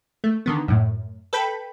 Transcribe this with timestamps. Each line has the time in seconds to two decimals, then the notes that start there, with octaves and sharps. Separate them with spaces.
0.24 A3
0.46 D3 D#3 B3
0.68 F#2 A2
1.33 A4 B4 G5 B5